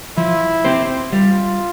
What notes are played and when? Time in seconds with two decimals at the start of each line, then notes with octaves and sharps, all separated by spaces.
0.17 F3 E4
0.65 C4 G4 C5
1.12 G3 F4